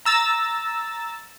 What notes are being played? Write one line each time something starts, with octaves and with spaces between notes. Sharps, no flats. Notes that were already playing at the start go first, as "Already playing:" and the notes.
A#5 E6 A6